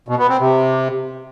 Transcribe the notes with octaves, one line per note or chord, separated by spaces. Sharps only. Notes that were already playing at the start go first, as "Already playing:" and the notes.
B2
B3
C4
C3